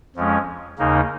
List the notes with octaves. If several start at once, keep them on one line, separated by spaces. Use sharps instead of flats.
F2 F3 G#3 C#4
D#2 C#3 A#3 D#4